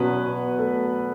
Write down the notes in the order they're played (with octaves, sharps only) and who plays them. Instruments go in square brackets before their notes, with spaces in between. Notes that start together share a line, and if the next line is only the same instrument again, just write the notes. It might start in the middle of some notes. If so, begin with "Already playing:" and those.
Already playing: [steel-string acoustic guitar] E2 B2 F#3 C#4 [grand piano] B3 B4
[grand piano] A3 A4